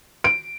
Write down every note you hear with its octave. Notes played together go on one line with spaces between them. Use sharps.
D7